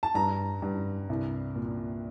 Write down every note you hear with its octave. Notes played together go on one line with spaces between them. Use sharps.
A5
G2 A#5
G2
C2
A#2